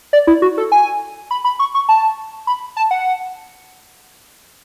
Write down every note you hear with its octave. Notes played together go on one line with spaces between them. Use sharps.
D5
E4
F#4
A4
G#5
B5
B5
C#6
C#6
A5
B5
A5
F#5